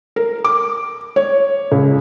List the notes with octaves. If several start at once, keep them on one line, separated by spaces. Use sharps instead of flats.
A#4
D6
C#5
C#2